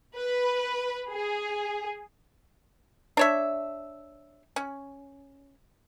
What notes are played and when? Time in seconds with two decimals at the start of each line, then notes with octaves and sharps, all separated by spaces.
0.16 B4
1.10 G#4
3.17 D4 C#5 E5
4.56 C#4